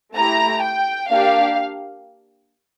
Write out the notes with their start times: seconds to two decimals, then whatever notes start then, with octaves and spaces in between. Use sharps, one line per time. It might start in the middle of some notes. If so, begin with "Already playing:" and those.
0.16 A3 E4 G4 A#5
0.63 G5
1.09 A#3 D4 G4 F5